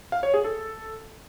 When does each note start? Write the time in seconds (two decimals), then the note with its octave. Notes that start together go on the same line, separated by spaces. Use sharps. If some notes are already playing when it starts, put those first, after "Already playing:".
0.12 F5
0.23 C#5
0.34 G#4
0.44 A4